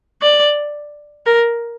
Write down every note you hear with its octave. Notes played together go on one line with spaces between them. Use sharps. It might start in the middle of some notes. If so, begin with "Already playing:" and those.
D5
A#4